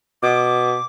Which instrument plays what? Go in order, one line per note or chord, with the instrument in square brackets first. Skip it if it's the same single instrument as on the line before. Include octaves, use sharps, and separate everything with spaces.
[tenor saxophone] B2 [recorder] D6